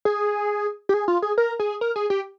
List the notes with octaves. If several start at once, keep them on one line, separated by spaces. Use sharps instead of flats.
G#4
G4
G#4
F4
G#4
A#4
G#4
A#4
G#4
G4